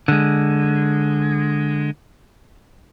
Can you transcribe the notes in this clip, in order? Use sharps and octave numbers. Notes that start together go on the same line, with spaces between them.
D3 G#3